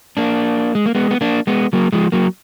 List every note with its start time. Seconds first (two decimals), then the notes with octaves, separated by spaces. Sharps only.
0.17 A#3 D4
0.75 G#3
0.86 A#3
0.95 G#3 B3
1.11 B3
1.21 A#3 D4
1.47 G#3 B3
1.73 F#3 A#3
1.92 F3 G#3
2.12 F#3 A#3